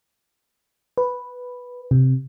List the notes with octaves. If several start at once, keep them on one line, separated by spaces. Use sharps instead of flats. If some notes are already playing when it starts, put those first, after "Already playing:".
B4
C3